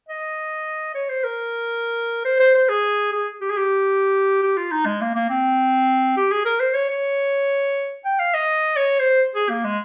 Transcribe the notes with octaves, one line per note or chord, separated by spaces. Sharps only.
D#5
C#5
C5
A#4
C5
C5
C5
G#4
G#4
G4
G#4
G4
G4
F4
D#4
G#3
A#3
A#3
C4
G4
G#4
A#4
C5
C#5
C#5
G5
F5
D#5
C#5
C5
G#4
A#3
G#3